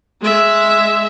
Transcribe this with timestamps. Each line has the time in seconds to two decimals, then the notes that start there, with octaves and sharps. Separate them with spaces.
0.21 G#3 E5